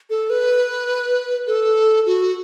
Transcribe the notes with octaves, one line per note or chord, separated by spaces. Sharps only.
A4
B4
A4
F#4